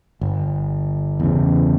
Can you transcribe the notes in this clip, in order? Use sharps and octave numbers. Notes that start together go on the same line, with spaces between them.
G1
E2 C#3